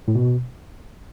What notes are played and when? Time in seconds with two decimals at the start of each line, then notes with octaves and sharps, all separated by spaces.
0.08 A2
0.15 B2